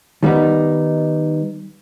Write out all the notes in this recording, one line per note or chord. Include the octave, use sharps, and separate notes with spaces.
D#3 G3 B3 D#4